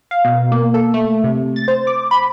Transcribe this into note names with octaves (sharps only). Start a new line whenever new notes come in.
F5
B2
A#3
A4
A3
C3
A6
C5
D6
B5